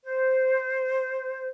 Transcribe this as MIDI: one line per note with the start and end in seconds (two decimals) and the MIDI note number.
0.03 1.48 72